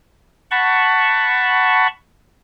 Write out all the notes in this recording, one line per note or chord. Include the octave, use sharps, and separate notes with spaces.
F#5 A5 B5 C#6